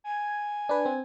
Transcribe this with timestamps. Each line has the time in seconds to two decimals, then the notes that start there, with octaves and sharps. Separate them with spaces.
0.04 G#5
0.69 D4 B4
0.86 C4